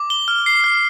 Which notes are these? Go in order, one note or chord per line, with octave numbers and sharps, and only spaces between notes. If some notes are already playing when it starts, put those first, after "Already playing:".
Already playing: D6
G7
F6
C7
F6